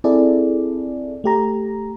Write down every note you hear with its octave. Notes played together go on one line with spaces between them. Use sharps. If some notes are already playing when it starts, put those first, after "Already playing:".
C4 E4 G#4 A4 D5
A3 G4 A#5